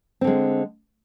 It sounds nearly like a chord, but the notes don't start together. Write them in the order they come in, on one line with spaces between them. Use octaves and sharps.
C4 D3 G#3